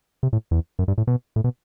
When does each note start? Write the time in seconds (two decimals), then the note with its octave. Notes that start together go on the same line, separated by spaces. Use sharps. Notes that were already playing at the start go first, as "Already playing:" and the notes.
0.23 C3
0.33 A2
0.51 E2
0.79 F#2
0.88 G2
0.98 A2
1.07 B2
1.36 A2
1.44 B2